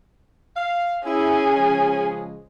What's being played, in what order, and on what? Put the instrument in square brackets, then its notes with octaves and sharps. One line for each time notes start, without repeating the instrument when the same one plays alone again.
[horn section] F5
[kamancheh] C#4 G#4 [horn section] E4
[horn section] C#3 F3 G#3